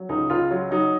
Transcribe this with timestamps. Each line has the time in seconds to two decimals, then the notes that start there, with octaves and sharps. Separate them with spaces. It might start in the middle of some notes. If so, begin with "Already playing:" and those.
Already playing: F#3
0.09 C#2 D#4
0.30 C#2 F4
0.51 F#3
0.71 F#3 D#4